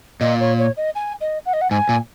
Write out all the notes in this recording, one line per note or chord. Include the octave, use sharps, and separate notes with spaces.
A#2 D#5
C#5
C#5
D#5
G#5
D#5
F#5
D#5
F#5
G#2 G#5
A#2